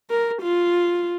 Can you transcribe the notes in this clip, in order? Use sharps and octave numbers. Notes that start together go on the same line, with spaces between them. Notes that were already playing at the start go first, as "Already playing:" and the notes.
A#4
F4